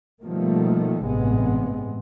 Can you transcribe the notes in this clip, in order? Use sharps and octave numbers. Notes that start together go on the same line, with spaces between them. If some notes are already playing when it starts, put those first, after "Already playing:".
B2 D#3 F3 G3 A3 A#3
A1 G2 C3 G#3 B3